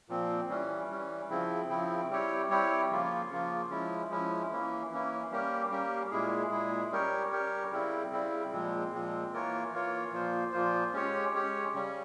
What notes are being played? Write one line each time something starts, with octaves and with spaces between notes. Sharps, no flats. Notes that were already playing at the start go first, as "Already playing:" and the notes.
A#2 F3 C4
E3 G3 C#4
E3 G3 C#4
C#3 F3 C4 E4
C#3 F3 C4 E4
G3 C4 E4 G4 C#5
G3 C4 E4 G4 C#5
C#3 F3 A#3 F4
C#3 F3 A#3 F4
F3 G#3 C#4 E4
F3 G#3 C#4 E4
E3 A#3 C#4 E4
E3 A#3 C#4 E4
G3 A#3 C#4 G4 A#4
G3 A#3 C#4 G4 A#4
A#2 G#3 E4 G#4
A#2 G#3 E4 G#4
G3 C#4 G4 A#4 C#5
G3 C#4 G4 A#4 C#5
C#3 G3 C4 E4
C#3 G3 C4 E4
A#2 F3 G#3 C4
A#2 F3 G#3 C4
E3 A#3 F4 A#4 C#5
E3 A#3 F4 A#4 C#5
A#2 F3 A#3 F4 C5
A#2 F3 A#3 F4 C5
G#3 C#4 G4 C#5
G#3 C#4 G4 C#5
C#3 G3 C#4